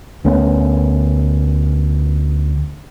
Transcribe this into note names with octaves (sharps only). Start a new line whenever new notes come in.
D2 A3 B3 C#4